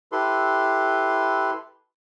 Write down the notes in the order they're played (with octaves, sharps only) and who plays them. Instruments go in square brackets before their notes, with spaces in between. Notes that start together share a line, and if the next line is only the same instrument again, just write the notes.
[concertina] E4 G4 A4 B4 C6